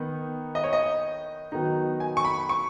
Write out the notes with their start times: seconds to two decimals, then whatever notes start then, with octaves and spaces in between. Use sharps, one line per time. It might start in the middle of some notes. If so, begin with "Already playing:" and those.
Already playing: D#3 B3 D#4
0.55 D#5
0.64 C#5
0.73 D#5
1.52 D#3 F#3 B3 D#4
2.00 G#5
2.17 C#6
2.25 B5
2.49 C#6